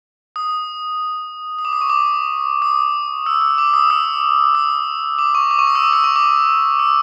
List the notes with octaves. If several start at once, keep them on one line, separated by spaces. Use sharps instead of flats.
D#6
D#6
D6
D#6
C#6
D6
D#6
E6
E6
D6
D#6
E6
D#6
D6
C#6
D6
C#6
D#6
E6
D6
E6
C#6
D6
E6